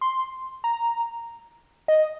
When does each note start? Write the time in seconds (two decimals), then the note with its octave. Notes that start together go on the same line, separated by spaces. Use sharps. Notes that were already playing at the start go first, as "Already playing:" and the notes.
0.01 C6
0.64 A#5
1.88 D#5